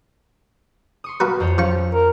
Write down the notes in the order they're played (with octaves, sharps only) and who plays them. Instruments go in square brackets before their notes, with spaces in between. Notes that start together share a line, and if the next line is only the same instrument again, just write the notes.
[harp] C6 C#6 D#6
[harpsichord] F#4 A#4 B4
[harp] F2 C5 C#5
[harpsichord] F3 C#6 [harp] C#4
[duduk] A#4